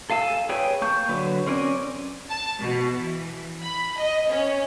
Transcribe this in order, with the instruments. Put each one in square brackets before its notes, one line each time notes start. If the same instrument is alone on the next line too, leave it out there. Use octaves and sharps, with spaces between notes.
[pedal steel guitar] A4 F5 G#5 A5 E6
G#4 B4 C#5 G5 G#5
A#3 A5 C#6 G6
D3 F#3 B4
C4 C#4 A#4 D5 G#5
[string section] A5
B2
E3
B5
D#5
C#4